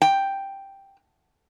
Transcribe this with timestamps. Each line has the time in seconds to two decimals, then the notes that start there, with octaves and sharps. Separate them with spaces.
0.02 G5